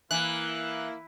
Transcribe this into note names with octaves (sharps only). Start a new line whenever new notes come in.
E3 A#3 E4 F#6